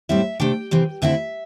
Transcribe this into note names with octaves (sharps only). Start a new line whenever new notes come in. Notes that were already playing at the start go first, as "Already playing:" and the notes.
A2 G3 C4 E4 E5
C3 A3 D4 G5
C3 E3 C4
D2 D3 C4 E4 E5